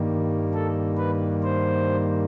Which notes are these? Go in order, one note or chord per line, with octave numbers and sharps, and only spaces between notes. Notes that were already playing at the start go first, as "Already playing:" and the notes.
Already playing: G2 D#3 G3 A#3
A4
B4
C5